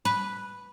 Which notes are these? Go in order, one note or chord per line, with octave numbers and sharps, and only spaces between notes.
B4